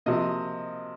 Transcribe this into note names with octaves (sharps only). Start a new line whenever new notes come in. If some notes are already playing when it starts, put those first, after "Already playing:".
C3 F3 A#3 D#5